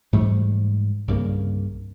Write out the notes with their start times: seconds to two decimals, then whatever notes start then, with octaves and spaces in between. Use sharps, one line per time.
0.13 G#2 E3 G3 A3
1.08 C2 G2 C#3 A#3